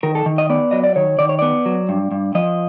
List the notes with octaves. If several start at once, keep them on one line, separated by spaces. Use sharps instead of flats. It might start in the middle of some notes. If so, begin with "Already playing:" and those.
D#3 A#4
A4
D#3
D#5
B3 D5
F#3 D#5
D5
D#3 C#5
D#3 D5
C#5
B3 D5
F#3
G2
G2
F3 D#5